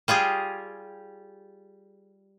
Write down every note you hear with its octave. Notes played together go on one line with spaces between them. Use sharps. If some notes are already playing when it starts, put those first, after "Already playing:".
G3 F4 G4 G#4